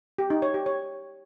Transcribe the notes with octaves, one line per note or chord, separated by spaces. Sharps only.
G4
D#4
C#5
G4
C#5